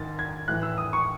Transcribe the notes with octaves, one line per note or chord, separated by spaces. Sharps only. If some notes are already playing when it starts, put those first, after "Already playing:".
Already playing: G#2 D#3 A6
G#6
A2 E3 F#6
E6
D#6
C#6